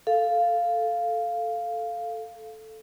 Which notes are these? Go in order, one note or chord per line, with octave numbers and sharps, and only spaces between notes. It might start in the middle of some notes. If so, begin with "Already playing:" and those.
A4 F5